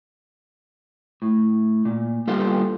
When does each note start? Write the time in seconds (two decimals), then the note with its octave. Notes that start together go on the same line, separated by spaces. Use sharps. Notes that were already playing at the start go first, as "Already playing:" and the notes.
1.22 A2
1.85 A#2
2.27 G3 A#3 B3 F4 G4 A4